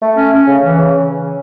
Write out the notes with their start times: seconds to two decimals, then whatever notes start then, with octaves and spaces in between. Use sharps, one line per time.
0.02 A3
0.16 C#4
0.31 C#4
0.46 C#3
0.62 E3
0.77 C#3